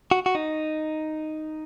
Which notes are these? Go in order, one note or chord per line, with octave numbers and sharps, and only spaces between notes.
F#4
F#4
D#4